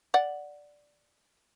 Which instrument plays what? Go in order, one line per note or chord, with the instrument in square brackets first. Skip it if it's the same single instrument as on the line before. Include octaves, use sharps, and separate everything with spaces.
[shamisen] D5 F#5